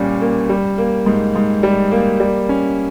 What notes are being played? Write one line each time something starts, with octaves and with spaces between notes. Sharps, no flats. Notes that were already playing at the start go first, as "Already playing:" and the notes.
Already playing: A#2 G3 C#4
A#3
G3
A#3
G#2
G#2
G3
A#3
G3
C#4